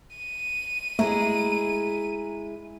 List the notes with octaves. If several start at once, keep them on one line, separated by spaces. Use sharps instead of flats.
D#7
G#3 A3 E4 G#4 E5 A#5